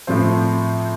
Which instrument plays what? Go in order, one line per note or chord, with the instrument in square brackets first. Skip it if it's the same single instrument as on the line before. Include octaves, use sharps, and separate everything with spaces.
[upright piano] A2 F3 C4 F4 C5